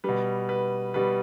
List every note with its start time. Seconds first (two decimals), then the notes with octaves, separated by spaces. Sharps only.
0.04 B2 G3 B4
0.49 B4
0.94 B2 G3 B4